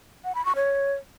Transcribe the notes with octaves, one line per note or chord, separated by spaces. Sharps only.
F#5
B5
C#6
C#5